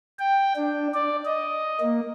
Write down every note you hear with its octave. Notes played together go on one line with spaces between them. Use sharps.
G5
D4
D5
D#5
A#3